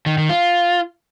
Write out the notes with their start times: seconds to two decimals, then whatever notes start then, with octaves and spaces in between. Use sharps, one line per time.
0.06 D#3
0.18 D#3
0.29 F4